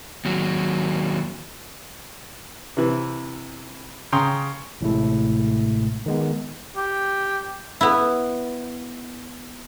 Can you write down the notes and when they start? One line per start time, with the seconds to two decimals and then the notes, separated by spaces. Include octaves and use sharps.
0.25 D#2 F#3
2.77 C3 E3
4.12 C#3 G5 A#5 C6 D#6
4.81 A1 A2 C3 G#3 A3 E4
6.06 D#3 G#3 B3
6.76 G4
7.81 B3 E4